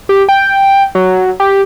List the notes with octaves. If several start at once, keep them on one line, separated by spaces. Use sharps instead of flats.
G4
G5
F#3
G4